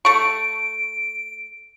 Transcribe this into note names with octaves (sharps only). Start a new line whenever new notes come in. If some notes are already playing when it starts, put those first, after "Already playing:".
A3 C#6 D7